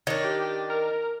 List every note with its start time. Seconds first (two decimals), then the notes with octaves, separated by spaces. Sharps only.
0.07 D#3 D4 C#5
0.24 G4
0.70 A#4